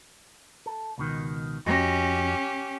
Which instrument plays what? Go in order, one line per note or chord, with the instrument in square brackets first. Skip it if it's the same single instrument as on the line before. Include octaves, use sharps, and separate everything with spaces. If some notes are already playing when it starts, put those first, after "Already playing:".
[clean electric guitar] A4
C#2 B2 D#3
[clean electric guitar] F2 F#4 D#5 [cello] C#4 G4